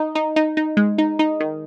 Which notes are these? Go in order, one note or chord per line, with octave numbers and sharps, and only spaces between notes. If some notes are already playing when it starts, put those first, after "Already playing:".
Already playing: D#4
D#4
D#4
D#4
G#3
D#4
D#4
D#3